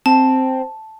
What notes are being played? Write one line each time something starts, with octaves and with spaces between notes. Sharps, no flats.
C4 A5